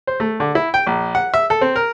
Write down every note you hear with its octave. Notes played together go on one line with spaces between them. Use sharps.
C5
A3
D3
E4
G5
A#1
F#5
E5
A4
C4
A#4